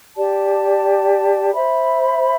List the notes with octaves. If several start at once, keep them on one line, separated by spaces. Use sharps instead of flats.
G4 D5 A5
C5 E5 B5